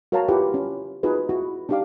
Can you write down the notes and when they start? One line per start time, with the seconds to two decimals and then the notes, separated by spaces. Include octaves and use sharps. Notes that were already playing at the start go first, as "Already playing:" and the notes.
0.12 F#4 A#4 C#5 F5 A5 A#5
0.28 E4 F4 G4 B4 F#5
0.54 C#4
1.03 D#4 F4 F#4 G#4 B4
1.29 E4 F#4
1.69 D4 D#4 G4 D5 F5 D6